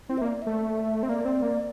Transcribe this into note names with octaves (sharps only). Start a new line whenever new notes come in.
C4 E4
E5
A#3 D5
A3 E5
C4
A#3 D5
C4
A#3